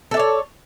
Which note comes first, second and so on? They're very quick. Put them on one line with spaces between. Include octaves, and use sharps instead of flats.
A4 E5 D5 C#5